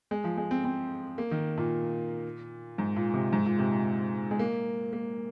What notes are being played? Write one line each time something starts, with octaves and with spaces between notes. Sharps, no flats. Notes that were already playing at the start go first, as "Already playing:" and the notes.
G#3
F3
G#3
C4
C4
A#3
D#3
A#2
G#2
A#2
C3
G#2
A#2
C3
A#2
G#3
A#3
A#3